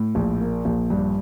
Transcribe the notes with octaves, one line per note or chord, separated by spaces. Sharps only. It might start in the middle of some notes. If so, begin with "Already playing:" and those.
Already playing: A2
A#1
A#3
A#1
G2